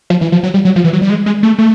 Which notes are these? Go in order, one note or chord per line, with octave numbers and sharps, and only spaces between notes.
F3
E3
F3
F#3
G3
F#3
F3
E3
F#3
G3
G#3
G#3
A3
A3